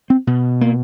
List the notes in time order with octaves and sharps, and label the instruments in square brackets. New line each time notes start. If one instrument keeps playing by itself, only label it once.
[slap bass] C4
B2
A#3